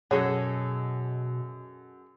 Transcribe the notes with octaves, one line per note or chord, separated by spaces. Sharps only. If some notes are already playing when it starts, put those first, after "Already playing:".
F#2 B2 G#4 A4 C#5 D#5 F#5